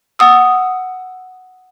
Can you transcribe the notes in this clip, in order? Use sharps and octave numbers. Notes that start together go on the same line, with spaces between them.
F#5 D#6 E6